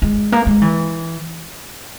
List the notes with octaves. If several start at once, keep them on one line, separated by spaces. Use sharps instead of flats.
G#3
A#3
G#3
E3